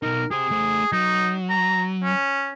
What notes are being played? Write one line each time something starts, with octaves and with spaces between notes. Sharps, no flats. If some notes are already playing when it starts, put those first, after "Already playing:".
B2 D#4 A#4
G4 G#4 C5
A3 C5
F#3 D#4
A#5
C#4